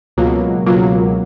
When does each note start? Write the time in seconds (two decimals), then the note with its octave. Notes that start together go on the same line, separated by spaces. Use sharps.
0.17 C#2 B2 F#3 A#3 F4
0.66 C#2 B2 F#3 A#3 F4